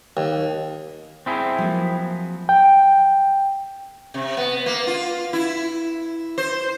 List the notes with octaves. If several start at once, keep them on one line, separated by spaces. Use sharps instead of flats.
D#2
C4 E4 G#4
F3 F#3 A#3
G5
C3
B3
A#3
F4
E4
C5